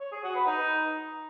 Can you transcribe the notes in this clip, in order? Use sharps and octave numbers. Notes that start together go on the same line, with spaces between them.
C#5
G#4
F#4
B4
D#4